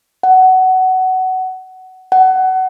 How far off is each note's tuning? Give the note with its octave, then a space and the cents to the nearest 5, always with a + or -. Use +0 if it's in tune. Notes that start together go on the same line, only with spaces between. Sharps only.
F#5 +15
F#5 +20